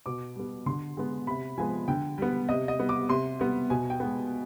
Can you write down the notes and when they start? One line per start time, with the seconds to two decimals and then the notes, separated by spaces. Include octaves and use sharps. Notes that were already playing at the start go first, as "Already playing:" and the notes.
0.06 B2 D6
0.36 G3 B3
0.66 D3 C6
0.97 G#3 B3
1.27 C3 B5
1.58 F3 G#3 B3 G#5
1.88 D3 G5
2.18 G3 B3
2.49 C3 D#5
2.68 D#5
2.79 G3 B3
2.89 D6
3.09 C3 C6
3.39 G3 B3
3.70 B2 G#5
3.90 G5
4.00 G#3 B3